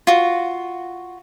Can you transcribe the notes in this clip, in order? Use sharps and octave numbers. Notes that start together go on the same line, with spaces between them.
F4 F#4